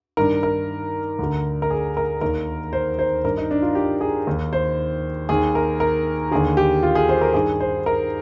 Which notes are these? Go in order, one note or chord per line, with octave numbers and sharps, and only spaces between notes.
G2 D#3 A#4
A#4
D2 D3
A#4
G#4
A#4
D#2 D#3 A#4
C5
C5
G2 D#3 A#4
D#4
D4
F4
G4
G#4
D#2 D#3
C5
D#2 D#3 G#4
A#4
A#4
D#2 D3 G#4
G4
F4
G#4
C5
A#4
G2 D#3 G#4
C5
A#4